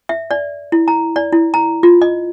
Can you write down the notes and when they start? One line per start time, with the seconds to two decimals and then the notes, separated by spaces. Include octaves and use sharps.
0.09 E5
0.31 D5
0.72 E4
0.88 A#5
1.16 D5
1.32 E4
1.54 A#5
1.83 F4
2.02 D#5